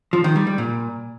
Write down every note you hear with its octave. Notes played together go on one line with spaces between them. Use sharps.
F3
D#3
G3
G3
A#2